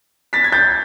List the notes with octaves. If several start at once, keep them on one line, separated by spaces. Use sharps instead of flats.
A6 B6
G#6
G6 A6